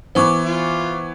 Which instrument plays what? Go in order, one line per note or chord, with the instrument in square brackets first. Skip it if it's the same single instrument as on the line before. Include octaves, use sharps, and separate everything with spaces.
[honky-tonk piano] E3 B3 [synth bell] C5 C#6 D6
[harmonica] F4